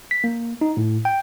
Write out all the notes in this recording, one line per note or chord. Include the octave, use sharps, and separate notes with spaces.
B6
A#3
D#4
A2
G5